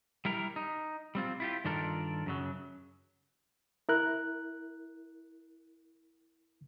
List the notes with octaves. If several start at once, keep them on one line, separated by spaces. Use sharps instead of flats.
G3 E4 A#4
D#4
G3 C4 F4
E4 F4 G4
G2 D#3 D4 F4 A4 A#4
F#2 C#3 F#3
E4 A#4 F#6